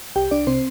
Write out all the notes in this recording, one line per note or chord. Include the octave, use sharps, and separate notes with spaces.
C2 G4 G5
C2 D4 D5
C3 C4 C5